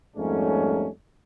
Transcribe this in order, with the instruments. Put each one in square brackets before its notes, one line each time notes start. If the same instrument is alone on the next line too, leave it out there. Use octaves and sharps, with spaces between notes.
[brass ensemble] F2 G#2 G3 A3 A#3 C#4